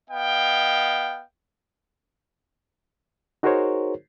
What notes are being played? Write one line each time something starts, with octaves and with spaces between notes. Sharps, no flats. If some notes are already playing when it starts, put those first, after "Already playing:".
B3 D#5 F5 G5
D#4 F#4 G#4 A#4 C5 C#5